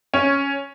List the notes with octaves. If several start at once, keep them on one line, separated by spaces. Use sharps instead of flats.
C#4